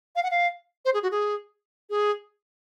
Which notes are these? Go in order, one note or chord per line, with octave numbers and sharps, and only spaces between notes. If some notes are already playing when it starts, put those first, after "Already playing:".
F5
F#5
F5
C5
G#4
F#4
G#4
G#4